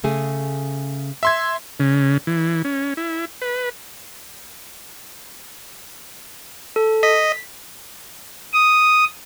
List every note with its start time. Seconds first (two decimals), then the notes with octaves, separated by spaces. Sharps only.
0.04 C#3 A3 G#4
1.23 E5 C6 G#6
1.80 C#3
2.27 E3
2.65 C#4
2.97 E4
3.42 B4
6.76 A4
7.03 D#5 B6
8.53 D#6